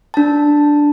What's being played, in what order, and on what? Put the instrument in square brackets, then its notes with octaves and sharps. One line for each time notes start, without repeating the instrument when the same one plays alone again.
[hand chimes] D4 A5